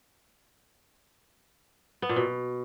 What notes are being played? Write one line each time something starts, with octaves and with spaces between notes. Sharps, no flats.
B3
A#2
B2